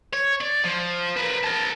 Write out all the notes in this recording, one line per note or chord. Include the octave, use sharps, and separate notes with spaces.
C#5
D5
F3
A#4 B4
A#4 A5